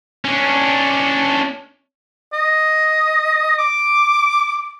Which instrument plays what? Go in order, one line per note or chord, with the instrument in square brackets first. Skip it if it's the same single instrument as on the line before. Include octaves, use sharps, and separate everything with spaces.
[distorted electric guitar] C#4 D4
[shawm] D#5
D6